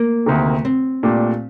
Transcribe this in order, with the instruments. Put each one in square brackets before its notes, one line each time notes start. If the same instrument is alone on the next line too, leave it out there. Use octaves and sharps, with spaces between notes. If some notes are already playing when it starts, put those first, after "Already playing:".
Already playing: [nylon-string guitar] A#3
[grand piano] D2 C3 D#3
[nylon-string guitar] C4
[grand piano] A#2 A3 D4 G4